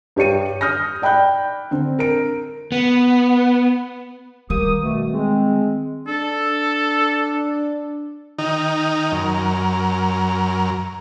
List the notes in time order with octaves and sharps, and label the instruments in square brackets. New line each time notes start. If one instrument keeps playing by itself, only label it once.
[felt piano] G2 G4 C#5 C#7 D#7
D#6 F6 G6 A#6
D5 G5 B5 F#6 G6
D3 C4
A#4 D7
[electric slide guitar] B3
[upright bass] D#3 G3 [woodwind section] A#3 G4 D#6
[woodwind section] B2 A3
G#3 C4
[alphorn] D4 [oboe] A4
[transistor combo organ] D#3 D#4
F#2 A#4